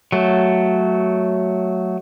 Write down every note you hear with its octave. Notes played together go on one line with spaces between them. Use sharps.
F#3 A3